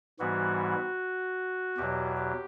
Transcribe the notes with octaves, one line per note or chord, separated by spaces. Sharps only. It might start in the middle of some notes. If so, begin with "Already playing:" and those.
G#2 E3 G3 B3 F#4
E2 B2 F#3 G4
G4